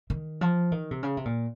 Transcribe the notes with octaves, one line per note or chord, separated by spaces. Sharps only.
D#3
F3
D#3
C3
C#3
C3
A#2